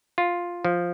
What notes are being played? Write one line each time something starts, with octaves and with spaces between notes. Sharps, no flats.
F4
F3